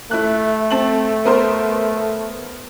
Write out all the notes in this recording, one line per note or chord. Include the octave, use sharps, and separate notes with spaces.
A3 E4 F#6
C4 A5 F#7
B3 A#4 C5